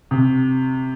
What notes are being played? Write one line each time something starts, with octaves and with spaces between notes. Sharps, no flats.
C3